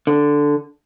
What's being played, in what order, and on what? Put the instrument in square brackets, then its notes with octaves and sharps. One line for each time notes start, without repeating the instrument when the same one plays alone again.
[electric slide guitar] D3